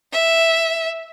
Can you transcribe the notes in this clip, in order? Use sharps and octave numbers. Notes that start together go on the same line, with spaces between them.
E5